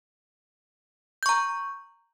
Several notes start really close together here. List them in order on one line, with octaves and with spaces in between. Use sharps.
G6 C#6 A#5